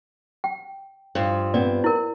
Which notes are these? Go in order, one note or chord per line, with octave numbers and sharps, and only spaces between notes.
G5
G2 F3
B3 C4 D5
E4 A#4